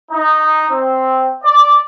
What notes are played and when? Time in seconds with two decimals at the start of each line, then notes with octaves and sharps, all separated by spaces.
0.11 D#4
0.71 C4
1.44 D5